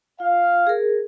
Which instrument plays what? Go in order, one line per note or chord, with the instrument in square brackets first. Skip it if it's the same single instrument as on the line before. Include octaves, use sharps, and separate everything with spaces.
[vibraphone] F4 [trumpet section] F5
[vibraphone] G#4 A#4